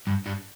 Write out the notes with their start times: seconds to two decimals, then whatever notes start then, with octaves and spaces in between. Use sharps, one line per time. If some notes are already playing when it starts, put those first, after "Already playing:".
0.07 G2
0.26 G2